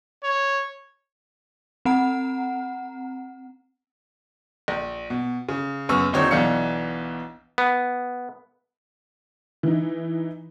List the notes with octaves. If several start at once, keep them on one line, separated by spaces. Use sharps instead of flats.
C#5
C4 F#5 A#5
A#1
B2
C#3
F#2 C#3 B3 C#6 E6 F6
D#1 A#2 D3 C4 D#4 C#5
B1 B2 E3 D4 F5 C#7
B3
E3 D#4